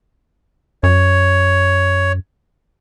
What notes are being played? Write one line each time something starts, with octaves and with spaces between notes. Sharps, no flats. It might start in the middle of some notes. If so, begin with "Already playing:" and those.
F#2 C#5